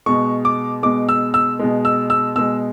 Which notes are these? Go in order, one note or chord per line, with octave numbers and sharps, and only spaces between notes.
B2 G#3 C#6
D6
B2 G#3 D6
E6
E6
B2 G#3
E6
E6
B2 G#3 E6